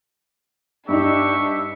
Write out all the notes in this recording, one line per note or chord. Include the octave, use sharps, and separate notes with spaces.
G2 D4 D#4 G4 E5 C#6